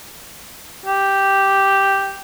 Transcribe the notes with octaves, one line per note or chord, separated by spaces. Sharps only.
G4